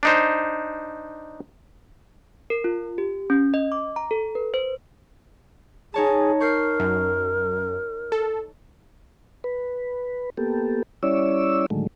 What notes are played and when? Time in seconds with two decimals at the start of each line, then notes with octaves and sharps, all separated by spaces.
0.03 D4 D#4 C5
2.50 A#4
2.64 F4
2.98 G4
3.30 C#4
3.54 D#5
3.72 D6
3.96 A#5
4.11 A4
4.35 B4
4.54 C5
5.94 D#4 G#4 C#5 A5
6.40 A#4 C#6 G6 C7
6.80 F#2
8.12 A4
9.44 B4
10.37 A#3 B3 G4 A4
11.03 G3 C#4 E4 C#5 D5 E6
11.70 A2 D3 D#3 F#3 G#3 A3